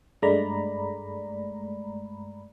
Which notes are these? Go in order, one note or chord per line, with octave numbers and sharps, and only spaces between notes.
G2 G#3 A3 D5 A#5 B5